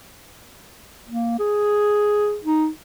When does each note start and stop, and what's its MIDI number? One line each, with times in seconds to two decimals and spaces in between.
1.08 1.34 58
1.39 2.38 68
2.44 2.67 63